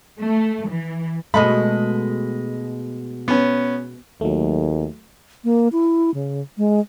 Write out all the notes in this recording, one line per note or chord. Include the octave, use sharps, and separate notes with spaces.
A3
E3
B2 G#3 A3 D#5 B5
B3 C#4
D#2 F#3 A3
A#3
E4
C#3
G#3